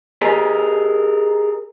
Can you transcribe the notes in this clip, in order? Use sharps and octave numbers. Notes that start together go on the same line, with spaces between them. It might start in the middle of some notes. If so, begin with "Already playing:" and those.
G4 G#4 A#4 D#5 A5